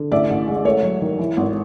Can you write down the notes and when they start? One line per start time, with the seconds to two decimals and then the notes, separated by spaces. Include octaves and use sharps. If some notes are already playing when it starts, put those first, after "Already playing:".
Already playing: D3
0.11 A1 D5 E5
0.30 A1
0.48 G#3
0.65 A3 C#5
0.83 F#3
1.01 D#3
1.19 E3
1.37 G#1